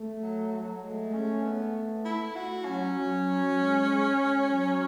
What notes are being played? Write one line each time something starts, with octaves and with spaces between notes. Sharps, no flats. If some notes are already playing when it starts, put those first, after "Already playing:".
Already playing: A3
F#3
F#3
G#3 A3
C#4
B3
E4
F#4
F#3 C#4
F#3
G#3
F#3